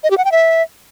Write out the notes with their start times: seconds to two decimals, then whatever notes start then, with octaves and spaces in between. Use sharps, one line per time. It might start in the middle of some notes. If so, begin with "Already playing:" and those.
0.04 D#5
0.11 G4
0.18 F#5
0.25 G5
0.32 E5